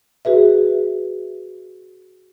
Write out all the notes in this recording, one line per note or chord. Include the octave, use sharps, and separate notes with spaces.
F#4 G#4 B4 E5